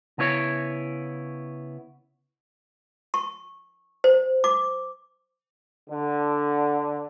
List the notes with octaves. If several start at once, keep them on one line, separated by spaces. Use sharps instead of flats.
C#3 B3 E4 C#5
C#6
C5
D6
D3